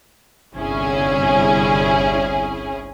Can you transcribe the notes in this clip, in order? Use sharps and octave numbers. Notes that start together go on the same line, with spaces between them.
G1 C2 C#4 E4 G#4